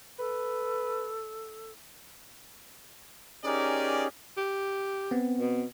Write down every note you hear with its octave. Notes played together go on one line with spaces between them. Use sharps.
A4 B4
C#4 D#4 G4 G#4 A#4 D5
G4
B3 C4
B2